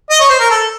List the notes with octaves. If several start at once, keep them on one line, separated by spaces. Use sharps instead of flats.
D#5
C#5
C5
A#4
A4